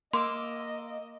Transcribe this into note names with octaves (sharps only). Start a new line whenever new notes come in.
A#3 D#5 C6 D6 E6